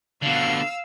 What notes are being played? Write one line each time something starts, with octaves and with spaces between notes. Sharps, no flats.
B2 D3 F5 E6